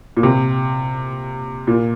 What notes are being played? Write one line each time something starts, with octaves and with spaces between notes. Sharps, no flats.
A#2
C3
A#2